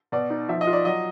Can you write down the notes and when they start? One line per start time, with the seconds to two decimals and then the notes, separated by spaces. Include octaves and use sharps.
0.12 B2 D5
0.30 D#4
0.49 F3 E5
0.61 D#5
0.67 F4
0.73 D5
0.85 F#3 D#5